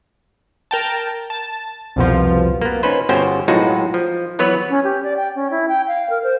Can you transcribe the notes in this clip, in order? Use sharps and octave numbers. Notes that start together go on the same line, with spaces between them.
A#4 G5 A5
A5
C2 F2 B2 F3
A#3 B3
C#4 D#4 B4 C5
G1 B2 C#4 F#4 C5 G5
B1 A2 G#3 D#4 F4 F#4
F3
E3 F#3 B3 F#4 B4 C#5
C#4
G4
D5
G5
C#4
E4
G5
F5
A#4
C5